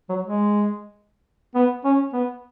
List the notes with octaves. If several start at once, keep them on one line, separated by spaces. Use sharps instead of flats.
F#3
G#3
B3
C#4
B3